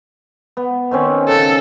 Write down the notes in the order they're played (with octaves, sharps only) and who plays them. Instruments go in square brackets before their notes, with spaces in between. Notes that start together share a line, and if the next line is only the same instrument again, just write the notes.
[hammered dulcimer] B3
D#3 C4 C#4
[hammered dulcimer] C#3 [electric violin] A4